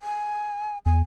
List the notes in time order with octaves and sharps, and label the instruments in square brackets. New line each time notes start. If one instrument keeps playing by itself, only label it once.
[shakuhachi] G#5
[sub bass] E2 [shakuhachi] G#5